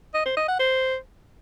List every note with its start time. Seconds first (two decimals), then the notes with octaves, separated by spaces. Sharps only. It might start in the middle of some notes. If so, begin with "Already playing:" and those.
0.14 D#5
0.26 C5
0.37 D#5
0.48 F#5
0.59 C5